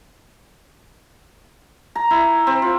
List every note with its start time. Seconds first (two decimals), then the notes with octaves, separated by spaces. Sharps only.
1.95 A#5
2.11 E4
2.47 C4
2.62 F4